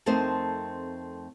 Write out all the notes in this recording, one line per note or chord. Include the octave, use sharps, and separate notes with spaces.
F2 A3 C4 D#4 A#4 C5